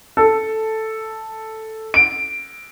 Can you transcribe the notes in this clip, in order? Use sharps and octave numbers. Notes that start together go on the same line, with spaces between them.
A4
D7